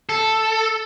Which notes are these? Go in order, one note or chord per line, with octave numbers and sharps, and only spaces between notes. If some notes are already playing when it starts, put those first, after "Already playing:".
A4